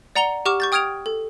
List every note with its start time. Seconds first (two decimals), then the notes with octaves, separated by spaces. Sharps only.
0.16 D5 F#5 A#5 C#7 F7 G7
0.46 G4 F#5 C#6 D6 F6 E7
0.60 C#6 G6 A6
0.72 G5 D#6 F6 G#6 D7 F7
1.06 A4